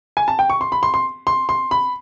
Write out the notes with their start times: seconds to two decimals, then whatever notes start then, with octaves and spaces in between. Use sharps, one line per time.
0.17 G#5
0.28 A5
0.39 G5
0.50 C#6
0.61 C6
0.72 B5
0.83 C6
0.94 C6
1.27 C6
1.49 C6
1.71 B5